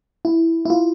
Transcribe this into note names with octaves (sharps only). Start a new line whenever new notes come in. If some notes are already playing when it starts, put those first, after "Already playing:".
E4
E4
F4